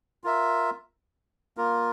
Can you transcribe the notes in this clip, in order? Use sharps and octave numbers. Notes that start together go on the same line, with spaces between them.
F4 A#4 E5
A#3 F4 A#4